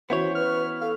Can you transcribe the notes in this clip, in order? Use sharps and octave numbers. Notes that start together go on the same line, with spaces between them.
E3 B3 C#4 E4 F#4 C5 C#5
B4 F6
A4 F5